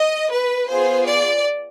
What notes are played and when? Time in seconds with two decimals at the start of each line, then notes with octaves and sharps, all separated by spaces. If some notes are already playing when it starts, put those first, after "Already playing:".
Already playing: D#5
0.31 B4
0.69 B3 F4 G#4 C5
1.07 D5